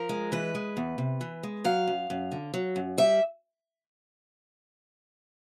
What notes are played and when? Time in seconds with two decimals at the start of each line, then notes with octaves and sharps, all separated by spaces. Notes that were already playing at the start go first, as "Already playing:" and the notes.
Already playing: F3 A#4
0.09 G#3
0.32 E3 B4
0.55 G#3
0.77 E2
0.98 C3
1.21 E3
1.43 G#3
1.64 F#3 F5
1.87 F#2
2.10 F#2
2.32 D3
2.54 F#3
2.76 F#2
2.98 G3 E5